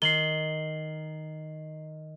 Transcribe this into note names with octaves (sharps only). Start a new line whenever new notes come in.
D#3 C7 F#7 G7